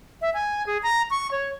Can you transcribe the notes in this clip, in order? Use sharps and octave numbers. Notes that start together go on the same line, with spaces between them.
E5
G#5
G#4
A#5
C#6
C#5